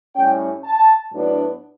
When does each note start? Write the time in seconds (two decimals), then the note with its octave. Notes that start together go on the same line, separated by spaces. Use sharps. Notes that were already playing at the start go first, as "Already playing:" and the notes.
0.15 A2 G3 C#4 G5
0.64 A5
1.13 A2 F#3 B3 D4